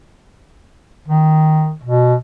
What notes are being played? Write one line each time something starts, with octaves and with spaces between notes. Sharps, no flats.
D#3
B2